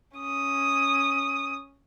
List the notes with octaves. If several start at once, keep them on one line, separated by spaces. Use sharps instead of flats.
C#4 D#6